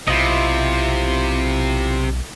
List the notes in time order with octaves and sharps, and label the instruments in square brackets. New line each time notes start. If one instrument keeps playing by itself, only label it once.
[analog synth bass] B1 [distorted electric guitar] C3 [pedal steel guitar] E4 F4 D#5